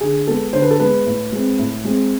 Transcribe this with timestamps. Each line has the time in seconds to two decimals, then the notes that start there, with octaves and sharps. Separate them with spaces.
0.01 D3 G#4
0.27 G#3 B3 A4
0.53 D3 C5
0.62 B4
0.71 A4
0.79 G#3 B3 B4
1.06 A2
1.32 G#3 C4
1.59 A2
1.85 G#3 C4